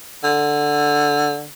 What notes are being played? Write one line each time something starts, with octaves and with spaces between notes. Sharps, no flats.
D3